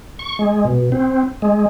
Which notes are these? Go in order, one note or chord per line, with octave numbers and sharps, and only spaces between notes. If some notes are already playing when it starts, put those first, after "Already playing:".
C#6
G#3
B2
C4
G#3